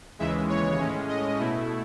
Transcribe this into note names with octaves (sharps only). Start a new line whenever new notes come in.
D#2 C#3 E3 G#3 E5
C#5
A2 G#3 C#4
D#5
B2 A3 E4